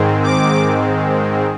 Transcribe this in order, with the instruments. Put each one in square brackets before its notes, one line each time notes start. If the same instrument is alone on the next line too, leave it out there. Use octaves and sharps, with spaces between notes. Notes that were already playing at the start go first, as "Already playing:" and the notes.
Already playing: [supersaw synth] G#2 D#3 G#3 C4
D6